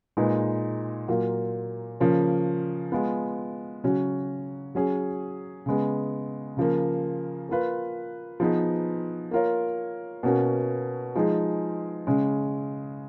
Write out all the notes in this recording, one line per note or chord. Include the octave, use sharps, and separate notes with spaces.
A#2 G#3 D#4 G#4 B4
A#2 F#3 A#3 F4
C#3 F3 A#3 C#4
G#3 B3 F4
C#3 F#3 C#4 F#4
F#3 C#4 G#4
C#3 G#3 B3
C#3 F3 A#3
A#3 F4 B4
F3 B3 D#4 G#4 B4
A#3 F4 A#4 C#5
B2 A#3 C#4 F#4
F3 G#3 D#4 G#4
C#3 G#3 C#4